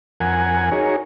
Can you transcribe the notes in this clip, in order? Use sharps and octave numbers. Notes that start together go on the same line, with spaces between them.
F2 A#4 F#5 G#5
D#4 F#4 G#4 A#4 C#5